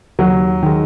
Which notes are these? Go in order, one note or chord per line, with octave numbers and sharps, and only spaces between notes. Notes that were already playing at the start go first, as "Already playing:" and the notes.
D#2 F#3
D#3 G#3